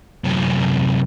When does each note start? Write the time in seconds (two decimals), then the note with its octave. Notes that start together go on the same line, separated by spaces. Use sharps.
0.25 F#2 C3